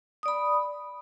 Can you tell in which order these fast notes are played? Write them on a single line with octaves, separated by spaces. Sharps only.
D#6 D5 B5